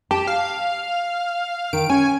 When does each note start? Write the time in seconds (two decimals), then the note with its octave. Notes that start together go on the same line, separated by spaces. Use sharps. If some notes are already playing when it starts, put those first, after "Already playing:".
0.11 G4 A5
0.27 F5
1.73 D#3 D7
1.90 C#4 G#5